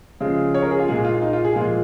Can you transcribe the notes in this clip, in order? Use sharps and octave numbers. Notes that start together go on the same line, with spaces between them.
C#3 F3 G#3
C#5
A#4
G#4
F4
A#2 G#3 G#4
F4
D#4
F4
G#4
A#2 F3 G#3 F4